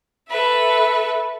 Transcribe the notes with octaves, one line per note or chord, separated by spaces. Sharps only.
A4 B4 E5